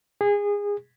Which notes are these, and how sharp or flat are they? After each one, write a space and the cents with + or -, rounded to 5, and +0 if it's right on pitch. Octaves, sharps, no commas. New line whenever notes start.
G#4 -25